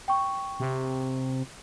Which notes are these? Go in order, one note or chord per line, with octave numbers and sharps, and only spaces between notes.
G5 C#6
C3